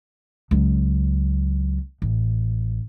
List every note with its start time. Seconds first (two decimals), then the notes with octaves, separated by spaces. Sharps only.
0.51 C#2 F#3
2.02 A1